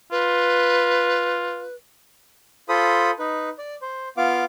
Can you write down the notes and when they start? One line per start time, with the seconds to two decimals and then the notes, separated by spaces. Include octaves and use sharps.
0.12 F4 B4
2.69 F4 A4 C5 B5 D#6
3.19 D#4 B4
3.58 D5
3.82 C5
4.17 B3 F4 F5 D6